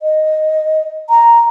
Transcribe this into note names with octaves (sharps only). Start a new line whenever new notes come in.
D#5
A#5